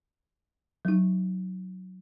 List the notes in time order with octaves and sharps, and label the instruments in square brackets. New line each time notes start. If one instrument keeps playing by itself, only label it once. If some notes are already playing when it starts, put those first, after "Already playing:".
[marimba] F#3 D#4